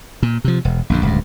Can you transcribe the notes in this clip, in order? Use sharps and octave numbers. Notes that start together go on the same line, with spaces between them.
A#2
C3 F3
E1
A#1 F#2 D3
D1 C#2 G2